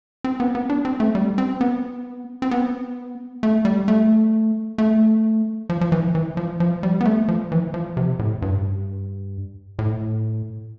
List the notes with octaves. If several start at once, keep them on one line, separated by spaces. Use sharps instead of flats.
C4
B3
B3
D4
C4
A3
G3
C4
B3
C4
B3
A3
G3
A3
A3
F3
F3
E3
E3
F3
F3
G3
B3
A3
F3
E3
F3
C3
A2
G2
A2